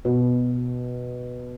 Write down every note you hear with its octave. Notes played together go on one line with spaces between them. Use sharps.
B2